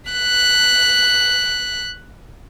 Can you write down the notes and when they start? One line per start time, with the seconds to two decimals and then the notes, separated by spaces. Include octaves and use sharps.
0.11 F#6 B6